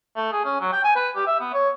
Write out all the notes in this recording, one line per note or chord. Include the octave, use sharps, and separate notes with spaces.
A3
G#4
C#4
F#3
G5
G#5
B4
G4
E5
B3
C#5